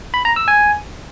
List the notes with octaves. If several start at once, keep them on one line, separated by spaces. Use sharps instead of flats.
B5
A#5
E6
G#5